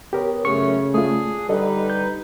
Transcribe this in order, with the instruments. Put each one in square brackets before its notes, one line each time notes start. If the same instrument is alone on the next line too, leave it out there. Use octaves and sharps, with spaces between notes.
[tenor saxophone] B3 [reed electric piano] G4 A#4 C#5
[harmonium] F#2 A3 [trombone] C#3 [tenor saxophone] C#4 [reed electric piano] C#6
[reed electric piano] A3 F4 [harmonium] D4 [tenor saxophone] G#4
[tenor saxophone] D3 [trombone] G3 [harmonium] D#4 B4 [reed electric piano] A4 D#5
[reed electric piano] G6